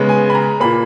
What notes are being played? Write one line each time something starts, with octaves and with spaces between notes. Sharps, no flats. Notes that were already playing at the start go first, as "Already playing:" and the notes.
Already playing: C#3 G#3 B3
G#5
B5
A#5
A#2 A#3 B5